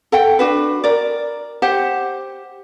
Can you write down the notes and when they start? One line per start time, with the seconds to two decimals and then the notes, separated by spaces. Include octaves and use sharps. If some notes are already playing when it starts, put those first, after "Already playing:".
0.12 A4 F#5 G5
0.39 D4 F#4 B4
0.84 A#4 D5
1.62 G4 C5 F#5